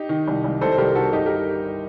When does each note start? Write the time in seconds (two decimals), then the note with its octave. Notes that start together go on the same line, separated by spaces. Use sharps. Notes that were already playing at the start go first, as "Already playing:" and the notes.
Already playing: D#4 G4
0.09 D#3
0.28 C2
0.44 C2
0.61 C2 A4 C5
0.72 C5
0.78 C2 G4 A#4
0.95 D#3 F#4 A4
1.13 G1 D#4 G4
1.26 G4 A#4